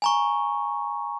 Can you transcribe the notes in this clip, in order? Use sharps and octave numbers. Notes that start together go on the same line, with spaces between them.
G#5 A#5 C#6